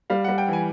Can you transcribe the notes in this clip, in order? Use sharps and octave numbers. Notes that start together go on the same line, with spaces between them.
G3 F5
G3 F#5
G5
E3 G#5